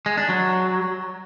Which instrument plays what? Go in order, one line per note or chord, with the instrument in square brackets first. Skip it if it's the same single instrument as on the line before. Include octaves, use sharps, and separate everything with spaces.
[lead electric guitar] G#3
D4
F#3